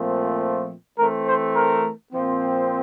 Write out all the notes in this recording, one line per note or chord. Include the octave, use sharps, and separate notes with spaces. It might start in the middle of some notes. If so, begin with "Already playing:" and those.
Already playing: A#2 F3 A3 C4
E3 A3 C4 A#4
C5
A#4
A#2 F3 C4